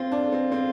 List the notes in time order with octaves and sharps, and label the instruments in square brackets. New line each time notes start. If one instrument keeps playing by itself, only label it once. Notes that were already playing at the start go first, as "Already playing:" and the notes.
Already playing: [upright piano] C4 [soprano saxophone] F4
[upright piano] D4
C4
C4